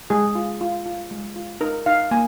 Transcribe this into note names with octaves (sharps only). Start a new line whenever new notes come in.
G#3 G#4
F4
F4
F4
G#3
F4
D#4 A#4
D#4 F5
A#3 G#5